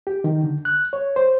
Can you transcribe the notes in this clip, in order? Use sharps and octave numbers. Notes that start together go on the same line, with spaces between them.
G4
D#3
D3
F#6
C#5
C5